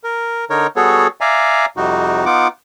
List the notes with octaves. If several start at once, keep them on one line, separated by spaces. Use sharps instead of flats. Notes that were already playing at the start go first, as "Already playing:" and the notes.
A#4
D3 D#4 A#4 C#5
G3 B3 F#4 G#4 A4 C#5
D5 E5 F5 G#5 A#5
F2 C3 G3 D#4 F#4
B3 D#4 F4 F#5 D6